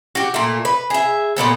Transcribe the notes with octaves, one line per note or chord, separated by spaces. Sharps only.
F#4 G4
A#2 A3
B4
G#4 E5
A#2 G3 B3 A4